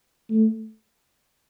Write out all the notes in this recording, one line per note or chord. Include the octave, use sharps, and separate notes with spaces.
A3